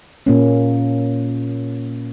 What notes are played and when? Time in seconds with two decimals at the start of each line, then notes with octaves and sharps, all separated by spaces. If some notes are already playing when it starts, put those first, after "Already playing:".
0.26 A#2 A#3 C#4